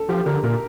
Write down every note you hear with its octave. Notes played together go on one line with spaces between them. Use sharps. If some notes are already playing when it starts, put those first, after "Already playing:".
Already playing: A4
F3 G4
D3 A#4
A#2 A#4